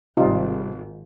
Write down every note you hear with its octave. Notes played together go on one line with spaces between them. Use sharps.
G#1 C3 G3 D#4 F4